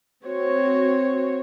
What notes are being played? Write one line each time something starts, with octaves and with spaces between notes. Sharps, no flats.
C4 F#4 C#5